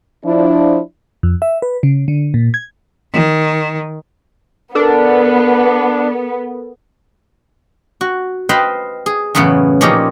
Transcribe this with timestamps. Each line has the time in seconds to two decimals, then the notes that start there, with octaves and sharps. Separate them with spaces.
0.25 F3 D4 E4
1.23 F2
1.42 E5
1.62 B4
1.83 C#3
2.08 D3
2.34 A#2
2.54 G#6
3.13 D#3
4.75 B3 D4 A4 A#4
8.01 F#4
8.49 B4 C5 D#5 F5 G5 B5
9.06 G#4
9.35 F#2 A2 C#3 E3 B3
9.81 A#2 F3 C#4 D#4 G4 A#4